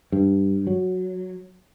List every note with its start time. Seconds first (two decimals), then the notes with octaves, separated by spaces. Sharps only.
0.12 G2
0.67 F#3